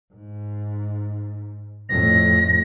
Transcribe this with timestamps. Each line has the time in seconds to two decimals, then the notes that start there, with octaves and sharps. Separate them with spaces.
0.14 G#2
1.89 F2 A2 A#6